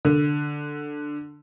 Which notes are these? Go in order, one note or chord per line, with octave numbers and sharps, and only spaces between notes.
D3